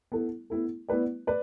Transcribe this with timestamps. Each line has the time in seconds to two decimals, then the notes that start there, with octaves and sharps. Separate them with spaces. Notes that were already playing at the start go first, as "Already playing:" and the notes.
0.12 B3 E4 A4
0.50 B3 E4 A4
0.89 B3 E4 B4 D5
1.27 B4 D5